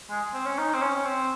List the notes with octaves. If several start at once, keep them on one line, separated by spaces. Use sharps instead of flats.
G#3
C4
C#4
D#4
C4
C#4
C4